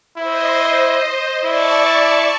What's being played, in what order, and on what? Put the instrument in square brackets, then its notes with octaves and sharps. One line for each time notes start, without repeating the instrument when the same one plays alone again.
[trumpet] E4 [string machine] C5 D#5
[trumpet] E4 [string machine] D5 A5 C#6